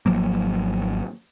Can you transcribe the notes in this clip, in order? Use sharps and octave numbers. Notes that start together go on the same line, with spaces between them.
G#1 F3 F#3 A#3